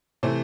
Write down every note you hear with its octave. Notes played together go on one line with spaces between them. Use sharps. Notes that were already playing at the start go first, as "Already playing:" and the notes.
C3 E3 A3 C4 C5